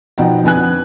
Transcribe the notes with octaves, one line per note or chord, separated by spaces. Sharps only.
B2 F3 D#4 F#5 G5
F2 D3 B3 G#5 F#6